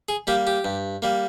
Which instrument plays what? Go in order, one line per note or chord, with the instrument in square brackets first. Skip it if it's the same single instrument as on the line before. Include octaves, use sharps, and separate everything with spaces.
[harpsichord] G#4
G3 A#3 G4
G4
G2
G3 A#3